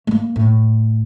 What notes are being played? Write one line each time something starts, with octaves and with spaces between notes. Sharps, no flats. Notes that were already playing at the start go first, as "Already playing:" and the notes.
A3 A#3
A2